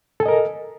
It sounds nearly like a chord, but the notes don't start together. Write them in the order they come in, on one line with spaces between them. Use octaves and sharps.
A4 G#5 D#5 A#4